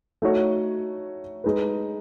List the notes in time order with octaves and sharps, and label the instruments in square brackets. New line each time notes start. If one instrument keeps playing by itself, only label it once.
[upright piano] A3 D#4 F#4 C#5
G#3 D#4 G#4 B4